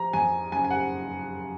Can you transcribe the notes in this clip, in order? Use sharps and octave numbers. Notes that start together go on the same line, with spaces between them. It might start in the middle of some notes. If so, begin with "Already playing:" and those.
Already playing: F3 A#5
F2 G#5
F#1 G#5
G#5
F#5